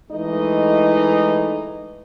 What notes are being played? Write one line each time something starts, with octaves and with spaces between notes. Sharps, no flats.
E3 G#3 A3 D#4 D#5